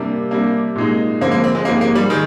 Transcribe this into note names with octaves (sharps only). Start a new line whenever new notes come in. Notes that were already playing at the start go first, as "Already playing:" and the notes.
Already playing: C3 G3 A#3 D4
C3 G3 A#3 D4
A#2 G#3 D#4
F2 D3 F3 G#3 A#3 C4
A#3
C4
G#3
G#2 F3 G#3 A#3 D#4 G4
A#3
G3
D#3 G#4